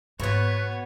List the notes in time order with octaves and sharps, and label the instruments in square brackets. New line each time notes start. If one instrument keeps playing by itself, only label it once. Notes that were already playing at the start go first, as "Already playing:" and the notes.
[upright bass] G#2 A#3 [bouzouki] B2 B3 [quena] B4 [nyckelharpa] C#5